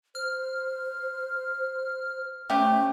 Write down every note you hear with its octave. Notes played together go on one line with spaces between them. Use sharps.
C5 F6
C3 A3 C#4 G4